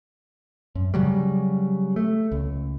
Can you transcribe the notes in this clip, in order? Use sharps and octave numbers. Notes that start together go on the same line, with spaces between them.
F#2
C#3 F#3 G3
A3
C#2